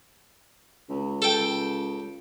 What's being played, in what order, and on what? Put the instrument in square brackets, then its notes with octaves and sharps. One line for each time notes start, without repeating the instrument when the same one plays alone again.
[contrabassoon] C#2
[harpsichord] A4 G5